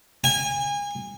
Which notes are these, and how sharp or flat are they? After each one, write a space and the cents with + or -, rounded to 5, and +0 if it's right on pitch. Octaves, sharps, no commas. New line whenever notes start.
G#5 -30